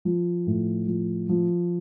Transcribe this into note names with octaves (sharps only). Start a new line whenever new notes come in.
F3
A2
F3
F3